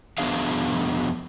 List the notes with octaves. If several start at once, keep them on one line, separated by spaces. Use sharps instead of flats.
F2 B3 D4 G#4 F5